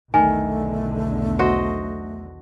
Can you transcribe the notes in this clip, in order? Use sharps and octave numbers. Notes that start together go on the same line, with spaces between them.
B1 E2 D3 D#3 A3 G#5
F#4 C5 D#5